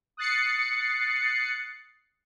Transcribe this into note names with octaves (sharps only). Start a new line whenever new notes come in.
D#6 F#6 A6 C7 C#7